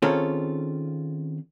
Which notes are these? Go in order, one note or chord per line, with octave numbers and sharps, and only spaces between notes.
D#3 C4 C#4 F4 G#4 A4